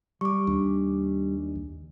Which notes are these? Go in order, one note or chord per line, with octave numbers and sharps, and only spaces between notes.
G3 C#6 D6
D#2 D4